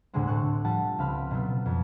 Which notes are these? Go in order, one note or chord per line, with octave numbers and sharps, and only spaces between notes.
D2 A2 D3 G3 G#3 C4
A2 A4 C#6 E6 F#6
F3 G3 F#5 A5
C#2 C4 F5 B5 F6 F#6
B2 F#3 B3
F2